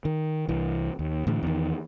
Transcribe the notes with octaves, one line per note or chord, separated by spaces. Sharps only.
D#3
C2 E3
D#2
A2 D3 E3
E2 D#3